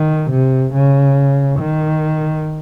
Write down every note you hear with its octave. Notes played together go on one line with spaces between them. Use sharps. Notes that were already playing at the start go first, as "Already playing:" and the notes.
Already playing: D#3
C3
C#3
D#3